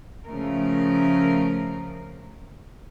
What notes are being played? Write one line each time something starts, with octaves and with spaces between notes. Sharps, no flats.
C#3 F3 A3 A#4